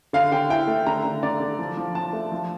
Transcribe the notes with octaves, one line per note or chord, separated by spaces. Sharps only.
D3 F5
D3 G5
E4 G5
A3
D3 A#5
D3
D3 D5
D3
F3
F3
F3 A5
A3
F3